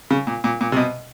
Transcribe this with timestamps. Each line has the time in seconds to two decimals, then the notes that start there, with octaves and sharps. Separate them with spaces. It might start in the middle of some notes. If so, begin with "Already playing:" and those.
0.11 C#3
0.27 A#2
0.44 A#2
0.61 A#2
0.72 C3
0.76 B2